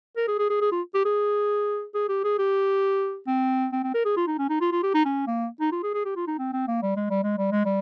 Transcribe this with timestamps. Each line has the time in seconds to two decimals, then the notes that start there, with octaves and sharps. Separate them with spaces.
0.16 A#4
0.28 G#4
0.39 G#4
0.50 G#4
0.61 G#4
0.72 F4
0.94 G4
1.05 G#4
1.94 G#4
2.09 G4
2.24 G#4
2.39 G4
3.27 C4
3.72 C4
3.83 C4
3.94 A#4
4.05 G#4
4.17 F4
4.27 D#4
4.39 C#4
4.49 D#4
4.61 F4
4.72 F4
4.83 G4
4.95 D#4
5.05 C#4
5.27 A#3
5.61 D#4
5.72 F4
5.83 G#4
5.94 G#4
6.05 G4
6.16 F4
6.27 D#4
6.39 C4
6.53 C4
6.68 A#3
6.83 G3
6.96 G#3
7.10 G3
7.24 G#3
7.38 G3
7.52 G#3
7.65 G3